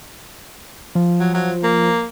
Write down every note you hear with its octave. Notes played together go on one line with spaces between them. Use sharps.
F3
F#3
F#3
A#3